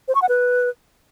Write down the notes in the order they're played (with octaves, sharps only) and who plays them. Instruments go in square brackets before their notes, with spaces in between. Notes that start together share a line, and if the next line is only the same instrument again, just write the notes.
[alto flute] C5
C#6
F#5
B4